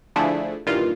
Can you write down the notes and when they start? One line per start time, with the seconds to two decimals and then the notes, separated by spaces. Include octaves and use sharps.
0.16 D3 F3 A3 D4 E4 G#4
0.66 G2 A#2 D#3 E3 F4